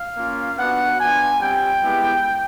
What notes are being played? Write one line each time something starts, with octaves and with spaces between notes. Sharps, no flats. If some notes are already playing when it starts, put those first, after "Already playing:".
Already playing: F5
A#3 C#4 F4
B3 D4 F#4 F#5
B3 D4 F4 G#5
G3 C4 F4 G5
G#3 B3 E4 G4